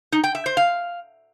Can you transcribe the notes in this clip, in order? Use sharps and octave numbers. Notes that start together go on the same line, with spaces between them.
D#4
G5
E5
C5
F5